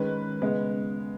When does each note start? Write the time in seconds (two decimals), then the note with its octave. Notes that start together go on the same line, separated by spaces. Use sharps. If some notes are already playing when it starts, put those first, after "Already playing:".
Already playing: D#3 G#3 C#4 B4
0.42 C#3 G#3 B3